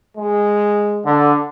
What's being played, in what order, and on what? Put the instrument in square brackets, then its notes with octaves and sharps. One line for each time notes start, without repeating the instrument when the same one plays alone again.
[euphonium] G#3
[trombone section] D3